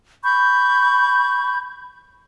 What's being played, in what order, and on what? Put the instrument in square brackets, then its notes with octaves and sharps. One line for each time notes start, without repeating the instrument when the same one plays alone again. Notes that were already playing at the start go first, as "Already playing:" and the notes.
[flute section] B5 C#6 G6